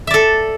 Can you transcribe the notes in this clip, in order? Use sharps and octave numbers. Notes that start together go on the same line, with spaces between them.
A4 D5 E5